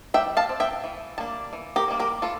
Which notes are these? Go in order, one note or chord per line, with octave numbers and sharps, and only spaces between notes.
G3 E5 G5
F5 A5
C4
E5 G5
E3
G3 A#3 D4 A5
E3
G4 A#4
G3 A#3 D4
G4 A#4
E3 F4 A4